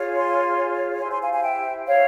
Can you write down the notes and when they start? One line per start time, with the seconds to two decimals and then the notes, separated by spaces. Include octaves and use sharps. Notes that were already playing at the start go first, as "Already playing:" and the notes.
Already playing: F4 G#4 C#5
0.16 G#5 C6
1.01 E4 G4 C5 G#5 C6
1.12 G#5 C6
1.22 F5 G#5
1.33 F5 G#5
1.43 E5 G5
1.86 C#5 F5